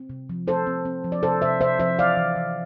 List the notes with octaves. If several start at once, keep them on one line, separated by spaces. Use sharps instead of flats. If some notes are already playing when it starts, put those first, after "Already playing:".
Already playing: C4
C3
F3
C4 A4 C5
C4
C4
F3
D5
C3 A4 C5
C3 C5 E5
C3 C5 E5
F3 C5 E5
E3 D5 F5
E3
E3